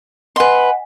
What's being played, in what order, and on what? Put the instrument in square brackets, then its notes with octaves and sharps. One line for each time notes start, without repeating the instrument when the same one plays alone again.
[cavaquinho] B4 C6 [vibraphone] D#5 F#5 G#5